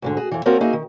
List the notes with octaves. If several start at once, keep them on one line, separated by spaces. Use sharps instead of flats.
D2 G#2 D3
F#4 G#4
F2 E3
A#3 C4 C#4 F#4 A#4 A5
A#3 D#4 F#4 G#4 D#5 E5
D#3